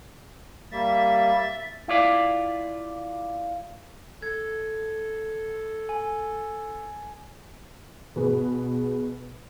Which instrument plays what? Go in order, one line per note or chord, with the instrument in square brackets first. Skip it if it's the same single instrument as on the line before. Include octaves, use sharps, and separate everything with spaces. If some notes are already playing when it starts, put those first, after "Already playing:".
[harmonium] G3 A#3 [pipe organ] E5 A6
[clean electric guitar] E4 F4 D5
[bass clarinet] A4 [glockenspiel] G#6
[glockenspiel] G#5
[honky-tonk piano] B2 G#4 B4